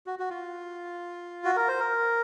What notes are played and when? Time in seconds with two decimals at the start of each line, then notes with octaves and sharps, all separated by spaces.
0.06 F#4
0.19 F#4
0.30 F4
1.44 F#4
1.56 A#4
1.68 C5
1.80 A#4